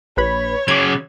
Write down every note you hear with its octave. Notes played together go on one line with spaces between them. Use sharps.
A#1 B4 C#5 B5
C#3 F#3 D6 G#6